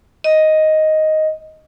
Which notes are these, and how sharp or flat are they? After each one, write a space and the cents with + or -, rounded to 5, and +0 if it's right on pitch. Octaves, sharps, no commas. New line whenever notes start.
D#5 +5